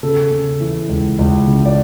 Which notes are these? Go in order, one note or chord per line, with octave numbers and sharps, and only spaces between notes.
C#3 A4
C#3
E3
C#2
C#2
C#3
D5